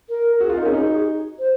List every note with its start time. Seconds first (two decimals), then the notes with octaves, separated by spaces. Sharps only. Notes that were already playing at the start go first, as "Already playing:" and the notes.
0.09 A#4
0.40 F#4 G#4
0.49 F4 A#4
0.57 D#4
0.63 G#4
0.65 C#4
0.73 D#4 G#4
0.84 F#4
0.94 G#4
1.38 C5